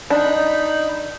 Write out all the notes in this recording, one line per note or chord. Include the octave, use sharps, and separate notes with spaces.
D4 D#4 B5